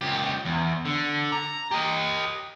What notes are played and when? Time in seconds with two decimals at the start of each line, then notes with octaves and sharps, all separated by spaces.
0.01 C#2 G4
0.45 E2
0.85 D3
1.32 A#5
1.71 G4 D#5